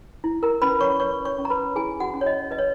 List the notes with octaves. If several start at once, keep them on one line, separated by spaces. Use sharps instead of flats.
E4
A#4 A#5
C#4 B4 B5
C#5 C#6
B4 C#5 C#6
C#5 C#6
C#4
A#5
B4 B5
E4 G#4 G#5
F#4 F#5
C#4
C#5
D#5
B4 D#5
C#5